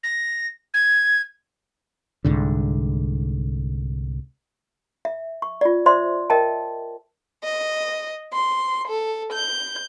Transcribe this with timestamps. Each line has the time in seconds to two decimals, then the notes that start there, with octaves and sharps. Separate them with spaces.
0.03 A#6
0.74 G#6
2.25 C2 G#2 D3
5.05 E5
5.42 C#6
5.61 F4 D5
5.86 C5 D5 E5 C6
6.30 A#4 D#5 E5 G5 A5
7.43 D#5
8.33 C6
8.88 A4
9.33 G6